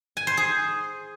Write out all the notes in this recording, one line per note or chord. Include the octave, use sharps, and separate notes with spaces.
G#5
C5
G#4